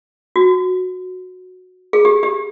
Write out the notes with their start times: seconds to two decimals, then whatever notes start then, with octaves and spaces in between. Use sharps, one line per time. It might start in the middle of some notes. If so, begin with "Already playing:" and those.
0.36 F#4
1.93 G#4
2.05 G4
2.23 G4